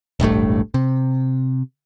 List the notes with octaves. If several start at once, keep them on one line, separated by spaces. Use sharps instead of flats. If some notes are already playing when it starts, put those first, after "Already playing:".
E1 A1 G2 A3
C3